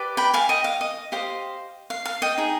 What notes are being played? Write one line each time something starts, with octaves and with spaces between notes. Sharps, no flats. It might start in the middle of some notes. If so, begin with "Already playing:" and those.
Already playing: G4 B4 D5
G5 B5
F5 G#5
D#5 G5
F5
D#5
G4 C5 D#5 F5
F5
F5
D#5 G5
D#4 G#4